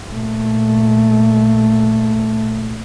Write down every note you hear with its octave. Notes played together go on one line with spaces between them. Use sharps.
A#2 A3